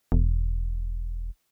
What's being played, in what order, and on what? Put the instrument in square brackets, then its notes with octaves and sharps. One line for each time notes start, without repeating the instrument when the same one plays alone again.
[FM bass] E1